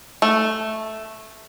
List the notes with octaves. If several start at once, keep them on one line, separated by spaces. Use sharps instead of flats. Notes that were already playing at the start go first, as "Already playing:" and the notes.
A3